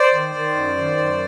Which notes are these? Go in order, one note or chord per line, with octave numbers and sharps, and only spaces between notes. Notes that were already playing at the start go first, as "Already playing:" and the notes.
Already playing: C5 D5
D#3
D#3
F#2
D#3
F#2